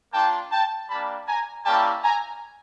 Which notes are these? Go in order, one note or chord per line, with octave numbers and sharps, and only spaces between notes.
A#3 D4 F4 G5 A5
G5 A5
G3 A#3 D4 A5 B5
G#5 A#5
G3 A#3 C#4 E4 G5 A5
G#5 A#5